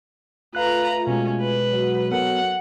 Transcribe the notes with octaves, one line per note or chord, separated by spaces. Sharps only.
A3 F4 B4 F5 A#5 F#6
B2 G#3 C#4
B4
F#3
B3 A4 A#4 F#5